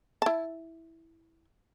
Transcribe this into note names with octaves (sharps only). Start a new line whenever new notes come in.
E4 A5